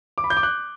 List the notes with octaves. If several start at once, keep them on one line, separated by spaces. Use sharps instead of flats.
D6
B5
G6
D6
F#6